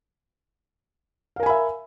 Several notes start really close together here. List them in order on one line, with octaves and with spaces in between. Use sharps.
F5 A#4 G#5 B5 E5